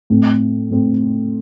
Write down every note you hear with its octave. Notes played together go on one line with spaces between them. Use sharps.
A2 A3 C4
A2 A3 C4